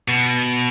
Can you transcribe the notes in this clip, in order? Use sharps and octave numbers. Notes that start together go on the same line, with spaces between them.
B2